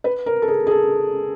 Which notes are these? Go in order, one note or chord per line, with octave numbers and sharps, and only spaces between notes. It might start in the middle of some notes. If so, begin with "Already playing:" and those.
B4
A#4
A4
G#4
G#4
A4